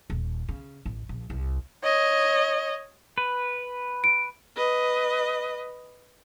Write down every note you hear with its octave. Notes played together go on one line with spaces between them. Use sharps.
D#1
C#3
A1
A#1
C2
C#5 D#5
B4
D7
B4 D#5